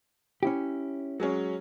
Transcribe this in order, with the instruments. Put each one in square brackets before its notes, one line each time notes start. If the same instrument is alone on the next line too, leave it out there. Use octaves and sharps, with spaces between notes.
[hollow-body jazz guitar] C#4 E4 G4
[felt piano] F#3 G#3 C#4